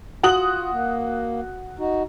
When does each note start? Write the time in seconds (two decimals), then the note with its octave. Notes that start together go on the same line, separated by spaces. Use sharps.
0.23 F4 F#4 D#6 F#7
0.72 A#3
1.79 D#4 F#4